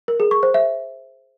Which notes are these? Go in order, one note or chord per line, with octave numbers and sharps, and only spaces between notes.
A#4
G#4
C#6
C5
E5